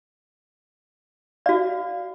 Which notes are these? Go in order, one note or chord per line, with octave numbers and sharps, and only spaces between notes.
F#4 D5 F5